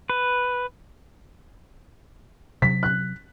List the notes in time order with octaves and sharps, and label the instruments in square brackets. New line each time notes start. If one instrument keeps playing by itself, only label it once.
[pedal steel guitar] B4
[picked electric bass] C3 F#3 [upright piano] B6
[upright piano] F#6